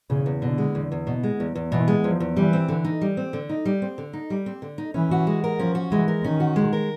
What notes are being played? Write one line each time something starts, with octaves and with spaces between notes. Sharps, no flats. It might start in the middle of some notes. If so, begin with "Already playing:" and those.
E2 C#3
E2
B2 D3
G#3
E2
E2
B2
G#3
E2
E2
B2 E3
G#3
E2 F3
E2
E3 G3
C4
D3
D#4
G3
C4
D3
D#4
G3
C4
D3
D#4
G3
C4
D3
D#4
E3 C#4
F#4
G#3
A#4
F3 C#4
F#4
E3 G#3
A#4
D#3 C#4
F#4
G#3
A#4